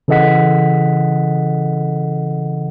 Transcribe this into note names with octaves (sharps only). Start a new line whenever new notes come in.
C#3 E3 A4 D#5 F#5 B6